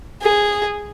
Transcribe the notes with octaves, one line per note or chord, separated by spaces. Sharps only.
G#4